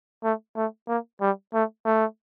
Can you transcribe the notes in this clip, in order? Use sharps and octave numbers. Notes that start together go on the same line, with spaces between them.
A3
A3
A#3
G3
A3
A3